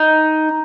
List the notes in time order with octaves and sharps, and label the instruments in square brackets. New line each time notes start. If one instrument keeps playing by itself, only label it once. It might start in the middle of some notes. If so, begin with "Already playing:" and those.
Already playing: [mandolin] D#4